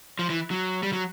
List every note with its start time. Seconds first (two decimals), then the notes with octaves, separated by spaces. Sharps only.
0.19 F3
0.30 E3
0.51 F#3
0.83 G3
0.93 F#3